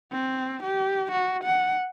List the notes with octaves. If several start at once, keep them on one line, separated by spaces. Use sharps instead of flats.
C4
G4
F#4
F#5